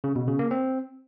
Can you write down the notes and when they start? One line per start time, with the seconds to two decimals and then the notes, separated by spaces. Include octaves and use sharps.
0.04 C#3
0.16 B2
0.27 C#3
0.39 A#3
0.51 C4